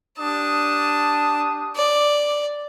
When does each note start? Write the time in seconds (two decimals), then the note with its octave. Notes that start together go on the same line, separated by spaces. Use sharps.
0.19 D4 G4 A5 D#6
1.76 D5